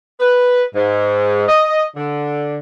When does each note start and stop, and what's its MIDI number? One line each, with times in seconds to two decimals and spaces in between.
0.20 0.62 71
0.74 1.43 44
1.48 1.83 75
1.97 2.58 50